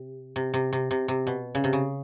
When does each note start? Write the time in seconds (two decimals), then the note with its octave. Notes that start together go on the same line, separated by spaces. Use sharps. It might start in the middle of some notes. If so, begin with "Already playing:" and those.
Already playing: C3
0.36 C3
0.54 C3
0.73 C3
0.91 C3
1.08 C3
1.27 B2
1.55 C#3
1.64 C3
1.73 C#3